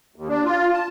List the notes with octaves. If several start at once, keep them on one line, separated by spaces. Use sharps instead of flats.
D#2
D4
F4
A5